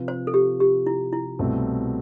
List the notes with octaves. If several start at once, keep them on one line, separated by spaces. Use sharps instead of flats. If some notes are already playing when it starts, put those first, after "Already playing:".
Already playing: C3 F3 C4 F4 B4
C5
A4
G4
G4
E4
E4
C2 B2 A3 C4